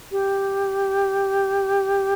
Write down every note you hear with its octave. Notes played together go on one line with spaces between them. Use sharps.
G4